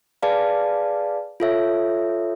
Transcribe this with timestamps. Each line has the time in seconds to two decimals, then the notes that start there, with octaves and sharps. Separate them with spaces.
0.23 G#4 B4 D5 F5 A5
1.40 F4 A4 C#5 E5